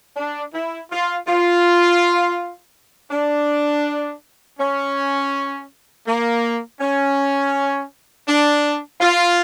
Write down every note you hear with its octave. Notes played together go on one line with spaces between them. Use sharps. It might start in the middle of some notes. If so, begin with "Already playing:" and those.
D4
E4
F4
F4
D4
C#4
A#3
C#4
D4
F4